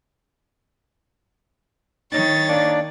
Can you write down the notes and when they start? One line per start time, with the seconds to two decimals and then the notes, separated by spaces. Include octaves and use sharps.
2.12 D#3 C#5 A6
2.48 A#3 D4 D5